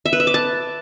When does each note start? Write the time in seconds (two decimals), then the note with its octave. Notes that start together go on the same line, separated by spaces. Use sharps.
0.06 E5
0.13 B4
0.20 E5
0.27 D6
0.34 A5